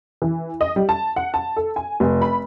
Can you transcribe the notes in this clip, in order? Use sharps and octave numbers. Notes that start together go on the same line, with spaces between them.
E3
D#5
G3
A5
F#5
A5
A4
G#5
F1
B5